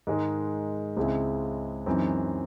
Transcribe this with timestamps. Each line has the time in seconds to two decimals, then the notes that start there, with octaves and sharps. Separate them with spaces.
0.07 G#2 D#3 G#3
0.97 C#2 C#3 G#3 C4 E4
1.86 F#2 E3 C4 D#4